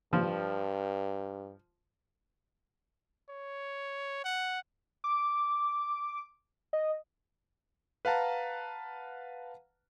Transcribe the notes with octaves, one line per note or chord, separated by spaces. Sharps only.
G2 F3
C#5
F#5
D6
D#5
B4 F5 F#5 A5 A#5